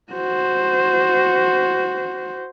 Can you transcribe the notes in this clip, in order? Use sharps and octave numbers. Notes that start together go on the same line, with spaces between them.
F#4 C5